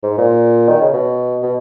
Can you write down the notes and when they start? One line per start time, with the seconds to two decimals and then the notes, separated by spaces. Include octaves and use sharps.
0.03 G#2
0.18 A#2
0.68 D#3
0.81 C#3
0.93 B2
1.43 B2